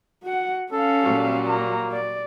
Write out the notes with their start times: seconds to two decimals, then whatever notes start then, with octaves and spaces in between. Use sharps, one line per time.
0.24 F#4 F#5
0.72 C#4 A4 F5
1.01 A#2 F#3 G3
1.47 A#3 A#5
1.92 D5